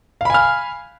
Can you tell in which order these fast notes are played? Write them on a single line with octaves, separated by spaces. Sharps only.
F5 B5 G#5 F6